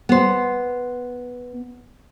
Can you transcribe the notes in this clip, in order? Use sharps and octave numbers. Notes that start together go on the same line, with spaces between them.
B3 C5